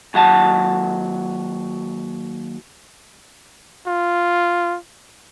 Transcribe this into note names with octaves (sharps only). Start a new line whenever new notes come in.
D#2 F#3 F#5 A5
F4